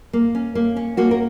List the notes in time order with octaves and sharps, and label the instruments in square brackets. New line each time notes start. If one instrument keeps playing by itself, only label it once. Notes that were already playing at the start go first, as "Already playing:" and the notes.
[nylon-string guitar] A#3
C#4
A#3
C#4
A#3 F#4
A#4